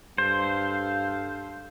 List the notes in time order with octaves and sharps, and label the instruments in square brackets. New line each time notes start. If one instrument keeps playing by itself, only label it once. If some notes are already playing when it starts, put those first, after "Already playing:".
[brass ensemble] G2 A4 F5 [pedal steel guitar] C5